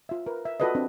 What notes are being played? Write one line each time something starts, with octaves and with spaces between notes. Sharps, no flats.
F4 E5
A#4 B4
E5
F4 F#4 A4 B4 D5 D#5
C4 D4